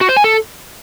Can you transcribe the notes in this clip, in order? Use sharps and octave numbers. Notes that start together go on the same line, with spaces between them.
F#4
C5
G#5
A4